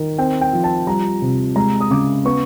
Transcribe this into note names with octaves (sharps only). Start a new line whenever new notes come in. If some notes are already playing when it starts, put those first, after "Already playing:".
Already playing: D#3
C4 G5
G5
F3
A5
G3 A#5
C3
G#3 A#5
D#6
C#3 D6
B3 C#6